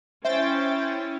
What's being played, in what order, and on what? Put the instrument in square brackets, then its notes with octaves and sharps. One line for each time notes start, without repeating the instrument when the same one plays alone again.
[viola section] C#4 E4 [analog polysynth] C5 G5 A6 [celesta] E5